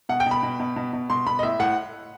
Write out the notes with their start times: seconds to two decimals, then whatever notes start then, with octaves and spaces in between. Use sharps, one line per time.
0.09 B2 F#5
0.20 G5
0.26 B2
0.31 B5
0.43 B2
0.59 B2
0.76 B2
0.93 B2
1.10 B2 C6
1.27 B2 B5
1.39 D#5
1.43 A2 E5
1.60 A2 F#5